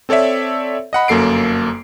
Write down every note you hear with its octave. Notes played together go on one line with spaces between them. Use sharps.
C4 A4 C#5 D5 E5
D#5 F#5 B5
G1 F#2 A#3 A4 C7 D7